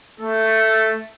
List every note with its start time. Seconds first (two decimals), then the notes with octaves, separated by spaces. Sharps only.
0.19 A3 A4